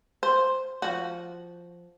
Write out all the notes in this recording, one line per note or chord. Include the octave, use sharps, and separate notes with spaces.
C5
F3 F#4